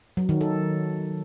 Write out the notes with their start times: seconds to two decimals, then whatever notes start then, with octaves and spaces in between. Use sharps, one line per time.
0.17 F#3
0.29 D#3
0.41 A4